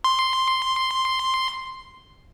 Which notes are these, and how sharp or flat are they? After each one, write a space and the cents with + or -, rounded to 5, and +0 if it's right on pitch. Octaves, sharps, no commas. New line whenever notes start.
C6 +0